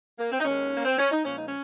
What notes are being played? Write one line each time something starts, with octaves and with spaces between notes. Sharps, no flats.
A#3
C4
D#4
D#2 D#3 G#3 C#4
A#3
C4
C#4
D#4
A#2 F3 G#3 C#4
D#4
C#4